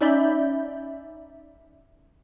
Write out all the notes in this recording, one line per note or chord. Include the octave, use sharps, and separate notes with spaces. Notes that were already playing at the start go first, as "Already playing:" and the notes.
C#4 D#4 D5 E5 B5 G6